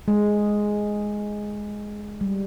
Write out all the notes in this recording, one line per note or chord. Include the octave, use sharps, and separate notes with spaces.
G#3
G3